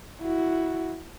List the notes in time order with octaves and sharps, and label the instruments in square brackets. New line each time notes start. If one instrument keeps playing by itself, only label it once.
[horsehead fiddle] E4 F#4